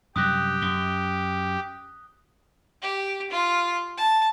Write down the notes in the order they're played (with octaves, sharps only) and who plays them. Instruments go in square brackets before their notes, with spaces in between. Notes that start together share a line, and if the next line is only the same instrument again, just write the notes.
[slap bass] F#2 C3 G3 [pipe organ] G4 [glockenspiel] D#6 F#6 A#6
[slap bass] F#2 [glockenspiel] D#6 G7
[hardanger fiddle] G4
F4
A5